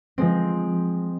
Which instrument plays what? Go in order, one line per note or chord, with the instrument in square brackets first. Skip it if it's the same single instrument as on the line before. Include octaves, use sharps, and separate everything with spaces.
[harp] F3 G#3 C4